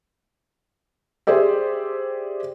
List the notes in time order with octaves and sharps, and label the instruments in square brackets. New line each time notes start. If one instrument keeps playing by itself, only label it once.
[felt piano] G4 G#4 C5 D5 E5